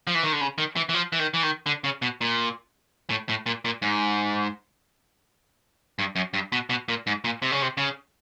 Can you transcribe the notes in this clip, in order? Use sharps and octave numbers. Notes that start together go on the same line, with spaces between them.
F3
E3
D#3
D3
C#3
D#3
E3
E3
F3
E3
D#3
E3
D#3
D3
C#3
B2
A#2
A2
A2
A#2
A#2
G#2
G2
F#2
G2
B2
B2
A#2
G#2
A#2
C3
C#3
C3
C#3